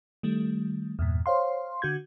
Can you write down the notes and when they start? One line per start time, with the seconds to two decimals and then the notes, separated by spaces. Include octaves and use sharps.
0.23 D#3 G3 A3
0.99 E2 G2 A#2
1.26 C5 C#5 F5 C6
1.82 D3 F#4 G6 G#6